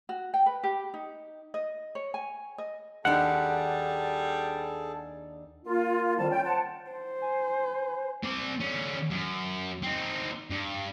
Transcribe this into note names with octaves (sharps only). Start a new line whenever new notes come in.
F#4
G5
B4
G4
D#4
D#5
C#5
G#5
D#5
D#2 G3 D4 G#4 A4 F#5 A5
A#3 F4
F2 D#3 G3 A5
C#4 G5
C5 F#5 A5
C5
G#5
C4 D5
D3 C#4
F#2
C4 D#4
G2